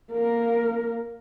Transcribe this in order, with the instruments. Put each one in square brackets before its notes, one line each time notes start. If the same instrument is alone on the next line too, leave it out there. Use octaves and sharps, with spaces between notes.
[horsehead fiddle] A#3 A#4